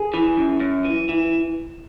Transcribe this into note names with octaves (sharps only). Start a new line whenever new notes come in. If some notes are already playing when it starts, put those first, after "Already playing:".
Already playing: G#4
E3
F#2
F#2
E3
E3